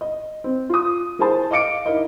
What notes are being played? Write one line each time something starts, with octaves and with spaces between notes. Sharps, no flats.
D#5
C4
F4 D#6
A#3 E4 G#4 C5 A5
D#5 F5 D6 C#7 D7
D#4 E4 A#4 D#5